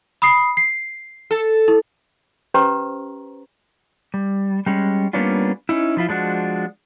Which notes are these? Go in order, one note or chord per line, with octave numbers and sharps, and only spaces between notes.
B5 D#6 C7
C7
A4
E4
C#4 G4 B4 C5 A#5 C#6
G3
G3 G#3 C#4
G3 A#3 B3 C#4 D4 F4
C#4 D#4 E4
F3 E4 F4
F3 G#3 D4 F#4